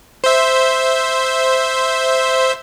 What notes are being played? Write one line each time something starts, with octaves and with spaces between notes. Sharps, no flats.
C5 E5